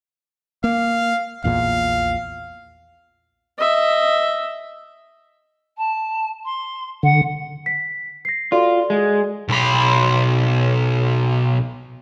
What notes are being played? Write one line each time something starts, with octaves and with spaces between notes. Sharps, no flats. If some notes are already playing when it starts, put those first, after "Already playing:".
A#3 F5
A#1 E2 A#2 F5
D#5 E5
A5
C6
D3 F#5
B6
A#6 C7
F4 F#4 A4 D5
G#3
B1 B5